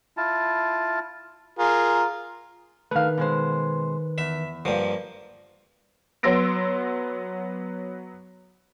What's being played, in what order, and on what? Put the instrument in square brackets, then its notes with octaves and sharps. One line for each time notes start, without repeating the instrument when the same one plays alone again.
[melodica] E4 F4 A5
[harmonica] F4 G#4 A#4
[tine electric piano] D#3 B4 [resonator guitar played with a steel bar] A3 F5
[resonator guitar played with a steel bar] B2 G#3 C5
[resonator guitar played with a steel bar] E2 [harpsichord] E5
[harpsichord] G2 F3 [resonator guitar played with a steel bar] A#3
[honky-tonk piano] F#3 B3 C6 E6 A#6 D7